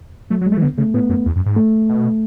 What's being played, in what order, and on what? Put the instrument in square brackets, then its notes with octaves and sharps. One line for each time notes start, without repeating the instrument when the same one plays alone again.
[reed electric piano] F#3 [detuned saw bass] A3
[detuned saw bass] F#3
[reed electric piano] G#3
[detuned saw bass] A3
E3
[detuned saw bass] D3 [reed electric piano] B3
[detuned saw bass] C#3 [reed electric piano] A3
[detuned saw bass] A2 [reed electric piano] B3
[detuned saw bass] F#2
E2
F#2
G#2
[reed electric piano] A3
[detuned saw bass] B2